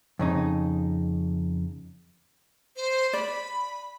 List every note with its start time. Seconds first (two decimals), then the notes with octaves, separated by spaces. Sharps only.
0.19 F2 C#3 D#4
2.76 C5
3.13 D5 B5